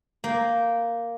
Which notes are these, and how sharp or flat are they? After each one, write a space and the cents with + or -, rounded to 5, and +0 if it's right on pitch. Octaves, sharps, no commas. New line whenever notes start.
A#3 +0 G5 -10